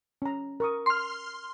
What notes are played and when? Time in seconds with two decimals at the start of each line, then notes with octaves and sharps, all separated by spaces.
0.22 C#4 A#5
0.60 A#4 C#6 D#6
0.86 C6 F6